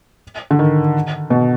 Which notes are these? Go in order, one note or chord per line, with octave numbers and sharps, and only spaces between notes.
D3
D#3
B2